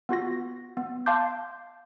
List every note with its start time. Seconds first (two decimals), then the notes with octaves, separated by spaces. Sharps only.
0.09 B3 F4 F#4 A#6
0.77 B3
1.06 F5 A5 C6 D6 G6